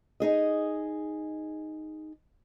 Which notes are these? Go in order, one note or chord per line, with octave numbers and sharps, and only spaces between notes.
D#4 G#4 D#5